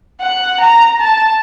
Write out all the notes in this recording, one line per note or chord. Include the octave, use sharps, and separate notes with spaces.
F#5
A#5
A5